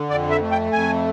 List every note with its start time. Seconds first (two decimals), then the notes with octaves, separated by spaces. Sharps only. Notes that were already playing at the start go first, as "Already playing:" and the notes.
Already playing: D3
0.09 F2 D5
0.30 E5
0.41 A3
0.51 G5
0.72 F2 G#5